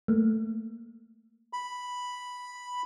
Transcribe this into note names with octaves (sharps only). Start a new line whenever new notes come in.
A3 A#3
B5